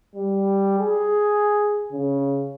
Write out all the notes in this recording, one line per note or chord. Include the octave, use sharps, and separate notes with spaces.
G3
G#4
C#3